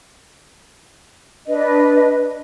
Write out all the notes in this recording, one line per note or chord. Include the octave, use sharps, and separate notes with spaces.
D4 B4 D#5